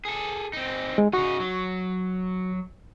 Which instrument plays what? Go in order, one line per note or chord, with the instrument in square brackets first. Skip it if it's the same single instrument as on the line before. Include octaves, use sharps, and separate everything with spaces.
[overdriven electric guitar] G#4 A4
C4 D#4
[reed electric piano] G#3
[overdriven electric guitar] C#3 D#4 [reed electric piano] F#4 C#6
[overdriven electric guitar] F#3